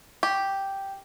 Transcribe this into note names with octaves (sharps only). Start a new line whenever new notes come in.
G4